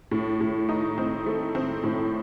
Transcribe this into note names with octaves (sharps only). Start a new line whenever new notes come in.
A2
A2
D#4
C4
A3
C4
A2